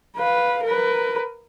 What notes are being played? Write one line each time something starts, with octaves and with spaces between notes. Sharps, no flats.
B4 F5
A#4 B4